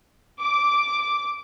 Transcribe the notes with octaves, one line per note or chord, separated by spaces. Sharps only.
D6